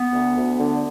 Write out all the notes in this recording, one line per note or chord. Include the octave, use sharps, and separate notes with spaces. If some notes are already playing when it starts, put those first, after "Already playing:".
Already playing: B3
D2
D2
D3